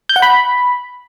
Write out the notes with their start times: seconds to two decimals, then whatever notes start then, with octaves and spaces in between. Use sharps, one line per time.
0.09 G6
0.16 F#5
0.22 B5